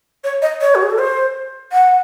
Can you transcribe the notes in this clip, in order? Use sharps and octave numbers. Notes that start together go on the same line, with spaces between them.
C#5
D#5
C#5
F#4
G#4
A4
C5
F#5